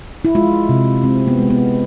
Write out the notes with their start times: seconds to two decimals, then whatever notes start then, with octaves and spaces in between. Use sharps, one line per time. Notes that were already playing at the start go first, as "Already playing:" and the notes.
0.25 E4
0.35 G#3 F4
0.69 C3
1.04 G#3 C4
1.27 B3
1.39 G#3
1.50 B3